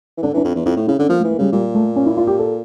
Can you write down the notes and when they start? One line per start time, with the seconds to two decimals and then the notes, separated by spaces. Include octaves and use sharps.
0.18 E3
0.23 D3 D4
0.34 E3 D4
0.45 F2
0.55 E2
0.66 F2 E4
0.77 A2
0.87 C#3 E4
0.99 D3 C#4
1.09 F3 A#3
1.19 A3
1.24 E3
1.31 A#3
1.39 C#3 G3
1.52 A#2 G3
1.75 A3
1.96 C#4
2.06 E4
2.17 F4
2.27 G4
2.39 A4